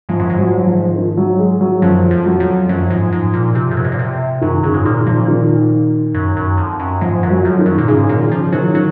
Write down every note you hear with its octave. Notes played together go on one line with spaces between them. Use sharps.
G#2 F3
F#2
G#2
F#3
F3
D#3
F#3
G#3
F#3
F#2 F3
F2
F#3
F2
F#2 F3
G#2
G#2
A#2
C3
F2
F#2
G#2
A#2
C3
F#2 D#3
F#2 C#3
G#2
A#2 D#3
A#2 F3
D#3
F#2
F#2
F2
F#2
G#2 F3
F#2
F#3
F2
D#3
F#2
A#2
G#2 C#3
A#2 D#3
C#3 F3
D#3 F#3
D#3 F#3